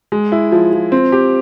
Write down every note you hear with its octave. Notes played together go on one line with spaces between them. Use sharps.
G#3
E4
F3
F3
C4
G4